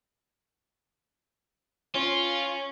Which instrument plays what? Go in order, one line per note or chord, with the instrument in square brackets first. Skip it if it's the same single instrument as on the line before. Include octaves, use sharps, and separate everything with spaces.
[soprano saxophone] C#4 [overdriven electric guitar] F4